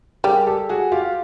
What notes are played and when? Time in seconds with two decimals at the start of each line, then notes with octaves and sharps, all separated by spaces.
0.24 G3 G#4 A#4
0.47 G4 A4
0.69 F#4 G#4
0.92 F4 G4